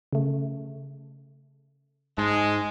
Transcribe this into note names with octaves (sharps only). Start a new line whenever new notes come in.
C#3 A3
G#2 G#3 A5